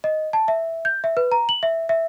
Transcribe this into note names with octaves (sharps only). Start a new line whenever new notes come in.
D#5
A5
E5
G6
E5
B4
A#5
F#7
E5
E5